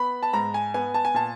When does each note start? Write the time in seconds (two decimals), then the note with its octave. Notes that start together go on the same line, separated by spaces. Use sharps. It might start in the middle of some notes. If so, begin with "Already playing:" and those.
Already playing: B3 B5
0.23 A5
0.33 G#2 A#5
0.54 G#5
0.74 B3 G#5
0.94 A5
1.05 G#5
1.14 A#2 A5